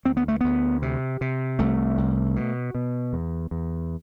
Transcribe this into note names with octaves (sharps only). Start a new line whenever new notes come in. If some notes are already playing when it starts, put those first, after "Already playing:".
D2 C4
B3
A3
D2 B3
C3
C3
C2 A3
C2
B2
B2
E2
E2